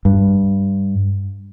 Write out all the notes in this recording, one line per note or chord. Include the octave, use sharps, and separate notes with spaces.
G2